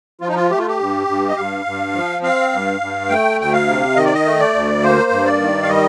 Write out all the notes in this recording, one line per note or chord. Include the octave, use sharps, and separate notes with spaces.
F3 F4
D#4
F4
A3 G4
F4
G4
G2
G2
D#5
G2 F5
G2
F3
C4 F5
G2
G2
A3 G5
D2 G5
F5
C3
D#3 D#5
D5
D#5
A3
D5
D2
A#3 C5
G2
D5
D#3
F5
G3 D#5